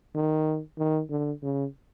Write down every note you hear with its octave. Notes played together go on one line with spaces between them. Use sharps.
D#3
D#3
D3
C#3